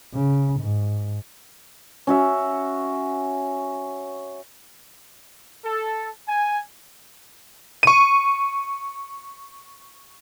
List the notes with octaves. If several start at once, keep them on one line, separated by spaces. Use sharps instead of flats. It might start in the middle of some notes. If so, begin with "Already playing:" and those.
C#3
G#2
C#4 F#4 E5
A4
G#5
C#6 D#7